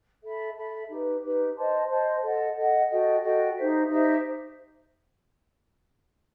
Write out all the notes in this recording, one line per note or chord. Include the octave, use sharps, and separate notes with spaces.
A4 E5 B5
A4 E5 B5
D#4 G4 B4
D#4 G4 B4
C5 D#5 A5 C6
C5 D#5 A5 C6
A4 D#5 F#5
A4 D#5 F#5
F#4 A4 D#5 G5
F#4 A4 D#5 G5
D#4 G4 C5 E5
D#4 G4 C5 E5